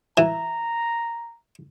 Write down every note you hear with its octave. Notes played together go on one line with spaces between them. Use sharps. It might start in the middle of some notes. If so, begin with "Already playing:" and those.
E3 A#5